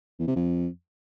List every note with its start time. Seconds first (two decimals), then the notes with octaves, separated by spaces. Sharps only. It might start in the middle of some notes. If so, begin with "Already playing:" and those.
0.19 E2
0.27 C3
0.36 F2